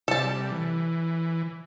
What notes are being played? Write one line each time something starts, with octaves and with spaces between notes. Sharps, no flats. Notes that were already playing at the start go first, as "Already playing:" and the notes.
C3 G3 A4 A5
E3